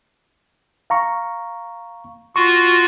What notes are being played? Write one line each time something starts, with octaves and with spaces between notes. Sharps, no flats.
F5 A#5 C#6
F4 F#4 C#6